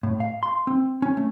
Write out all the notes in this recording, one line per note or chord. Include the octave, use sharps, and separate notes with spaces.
A2
F5
C6
C4
C#4
A3